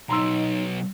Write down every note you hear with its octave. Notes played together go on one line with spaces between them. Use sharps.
B1 D#4 A#5 C6 E6